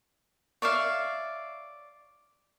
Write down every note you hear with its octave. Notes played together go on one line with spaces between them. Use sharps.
C#5 D5 E5 F5